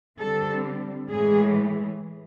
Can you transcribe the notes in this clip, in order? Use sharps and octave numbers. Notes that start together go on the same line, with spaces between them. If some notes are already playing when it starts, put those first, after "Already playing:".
D3 G3 C4 A4
A2 E3 G#3 G#4